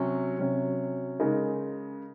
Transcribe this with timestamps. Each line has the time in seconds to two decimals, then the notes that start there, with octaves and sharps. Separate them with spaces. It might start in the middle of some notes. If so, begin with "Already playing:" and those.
Already playing: C3 F#3 C#4
0.38 C3 F#3 C#4
1.20 C#3 G#3 D#4 A#4